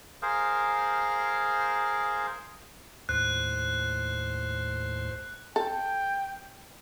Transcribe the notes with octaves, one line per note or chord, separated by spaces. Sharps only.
G#4 A#4 C5 F5
D#2 A2 C5 F#6
A4 G5